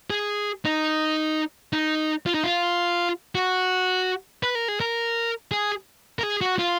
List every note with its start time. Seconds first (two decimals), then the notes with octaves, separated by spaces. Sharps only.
0.10 G#4
0.65 D#4
1.73 D#4
2.26 F4
2.34 D#4
2.44 F4
3.35 F#4
4.43 B4
4.55 A#4
4.68 G#4
4.80 A#4
5.51 G#4
6.19 A#4
6.23 G#4
6.41 F#4
6.59 F4